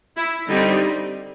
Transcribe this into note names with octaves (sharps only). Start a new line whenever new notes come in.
E4
D3 G3 C4 D#4